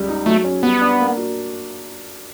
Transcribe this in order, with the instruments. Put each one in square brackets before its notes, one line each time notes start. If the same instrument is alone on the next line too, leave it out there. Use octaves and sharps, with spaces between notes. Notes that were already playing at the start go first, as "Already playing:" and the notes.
Already playing: [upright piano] C#2 G3
D#4
[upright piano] F#3 [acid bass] A3
[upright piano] C#4
[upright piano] G3 [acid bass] B3
[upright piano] D4
A#3
F#4